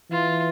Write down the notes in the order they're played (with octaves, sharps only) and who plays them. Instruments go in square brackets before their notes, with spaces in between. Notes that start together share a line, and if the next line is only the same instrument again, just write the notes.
[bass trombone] E3 [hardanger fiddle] F4